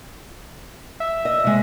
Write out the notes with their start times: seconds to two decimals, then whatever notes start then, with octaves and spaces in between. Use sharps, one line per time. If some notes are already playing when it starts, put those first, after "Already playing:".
1.00 E5
1.25 D#5
1.44 C3 G#3